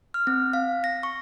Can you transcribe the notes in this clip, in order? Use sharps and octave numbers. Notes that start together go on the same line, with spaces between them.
F6
C4
F5
A#6
C#6